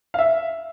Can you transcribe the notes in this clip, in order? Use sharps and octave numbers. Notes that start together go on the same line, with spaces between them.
F5
E5